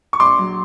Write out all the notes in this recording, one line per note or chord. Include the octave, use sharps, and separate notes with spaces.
C#6
A#1 C6 D6
F#3